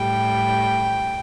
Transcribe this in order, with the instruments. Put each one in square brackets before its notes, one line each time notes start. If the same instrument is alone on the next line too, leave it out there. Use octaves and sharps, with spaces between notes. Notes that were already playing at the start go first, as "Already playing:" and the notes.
Already playing: [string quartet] A2 G3 G5